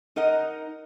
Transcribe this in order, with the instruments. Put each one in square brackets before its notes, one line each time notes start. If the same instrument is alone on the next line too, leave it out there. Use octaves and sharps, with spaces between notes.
[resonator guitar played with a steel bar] D#4 A#4 D#5 F#5